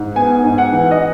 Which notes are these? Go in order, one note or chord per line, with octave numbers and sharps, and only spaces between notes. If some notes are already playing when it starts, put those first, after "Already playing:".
Already playing: G#2
B3 G#5
G#2
F#5
E3
D#5